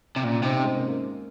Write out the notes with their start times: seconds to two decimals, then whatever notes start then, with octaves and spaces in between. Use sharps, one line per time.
0.16 C3
0.23 A#2 C#4 F4
0.42 C3 C4 D#4
0.55 C#4
0.63 G#3 C4
0.75 A#3 C#4
0.88 A#3 C#4